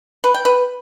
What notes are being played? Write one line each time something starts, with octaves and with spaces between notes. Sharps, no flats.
B4
G5
B4